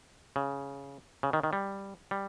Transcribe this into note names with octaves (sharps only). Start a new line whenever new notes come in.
C#3
C#3
D#3
D#3
G3
G3